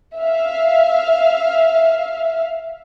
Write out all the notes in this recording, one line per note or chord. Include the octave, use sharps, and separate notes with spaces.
E5 F5